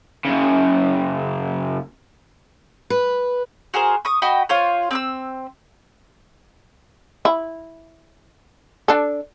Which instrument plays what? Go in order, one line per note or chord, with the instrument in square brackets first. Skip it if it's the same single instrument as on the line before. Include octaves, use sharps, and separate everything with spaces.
[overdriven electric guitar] F#2 C#3
[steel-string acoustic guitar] B4
[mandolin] F#4 G#4 A#4 C5
C#6 D#6
F#4 D#5 G5 B5
F4 C5 C#5
C4 D6 E6
[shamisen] E4
D4 A4